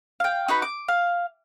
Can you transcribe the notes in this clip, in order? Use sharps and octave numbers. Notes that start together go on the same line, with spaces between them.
F5 G5
D#4 F#4 B4 B5
D6
F5